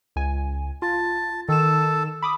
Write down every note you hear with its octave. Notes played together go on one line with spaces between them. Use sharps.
C#2 G#5
F4 A5
D#3 A4 E7
B5 D6 D#6